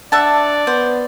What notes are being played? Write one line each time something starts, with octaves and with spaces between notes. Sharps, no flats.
D4 D5 E5 F#5 A5
B3 C5